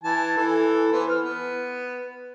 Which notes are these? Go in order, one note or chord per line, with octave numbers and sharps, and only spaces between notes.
E3 G#5 A5
E3 A4
E3 B3 C5
F6
B3